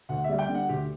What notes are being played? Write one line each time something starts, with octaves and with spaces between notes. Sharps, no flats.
D2 F#5
G3 E5
G5
D3
F#5
D2 G4